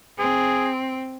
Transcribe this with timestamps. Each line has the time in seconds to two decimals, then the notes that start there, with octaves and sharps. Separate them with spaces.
0.18 C4 G#4